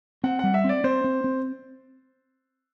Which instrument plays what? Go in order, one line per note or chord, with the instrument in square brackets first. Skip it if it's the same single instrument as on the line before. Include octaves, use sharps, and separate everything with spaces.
[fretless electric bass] C4 [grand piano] F#5
[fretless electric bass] G3 [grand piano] F#5
[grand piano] E5
[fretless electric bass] C4 [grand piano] D5
[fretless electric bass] C4 [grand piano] C5
[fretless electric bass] C4
C4